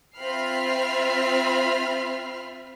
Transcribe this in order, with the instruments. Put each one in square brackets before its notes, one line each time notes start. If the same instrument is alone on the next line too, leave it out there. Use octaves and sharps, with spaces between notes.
[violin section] C4 F4 E5 B5 F6 C7